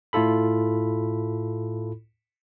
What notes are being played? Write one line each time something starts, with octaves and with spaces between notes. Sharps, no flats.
A2 E4 F4 A4 B5